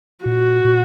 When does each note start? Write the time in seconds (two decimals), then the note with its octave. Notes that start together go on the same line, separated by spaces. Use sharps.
0.25 A#2 F#4
0.65 A#2